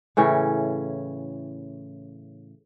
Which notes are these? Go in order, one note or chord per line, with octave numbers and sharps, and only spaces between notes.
A2 C#3 E3 C#4